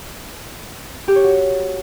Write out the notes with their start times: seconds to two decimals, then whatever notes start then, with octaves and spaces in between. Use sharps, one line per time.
1.08 G4
1.16 C#5
1.24 F#4